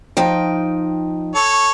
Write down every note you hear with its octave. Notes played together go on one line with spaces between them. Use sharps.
F3 D#4 G5
A4 C#5